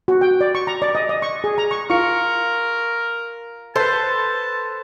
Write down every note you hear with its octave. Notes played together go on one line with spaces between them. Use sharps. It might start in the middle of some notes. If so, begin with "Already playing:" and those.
F#4
G5
D5
C#6
A#5
D5
D#5
D#5
C#6
G#4
A#5
C#6
F4 A#4 C#6 C#7
A4 B4 C5 A5